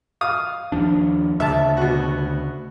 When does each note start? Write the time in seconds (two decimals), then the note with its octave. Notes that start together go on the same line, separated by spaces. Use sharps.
0.21 F5 D#6
0.72 D#2 F3 D4
1.40 D2 C#3 E5 A5
1.77 B2 F#4